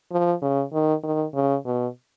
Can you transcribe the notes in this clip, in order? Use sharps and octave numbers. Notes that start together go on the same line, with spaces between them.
F3
C#3
D#3
D#3
C#3
B2